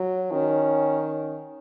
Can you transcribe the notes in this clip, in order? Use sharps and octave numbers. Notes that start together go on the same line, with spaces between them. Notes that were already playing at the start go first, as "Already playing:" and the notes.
Already playing: F#3
D#3 C#4